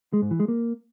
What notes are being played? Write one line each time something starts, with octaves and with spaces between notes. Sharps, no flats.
G#3
G#2
E3
G#3
A#3